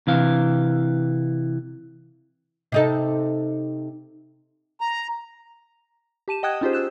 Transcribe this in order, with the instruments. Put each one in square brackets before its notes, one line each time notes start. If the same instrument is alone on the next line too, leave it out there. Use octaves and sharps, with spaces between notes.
[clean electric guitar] C3 E3 F5
[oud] C3 D#4 A4
[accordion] A#5
[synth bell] G4 A5 D#7 E7
D#5 F#5 G5 D#6 F#6 G#6
C#4 D#4 F4 G4 G#4 C5
E6 F#6 E7